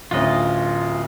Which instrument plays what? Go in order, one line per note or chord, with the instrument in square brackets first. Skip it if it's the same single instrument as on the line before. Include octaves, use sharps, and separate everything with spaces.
[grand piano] D1 D2 C#4 [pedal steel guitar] F4 D#5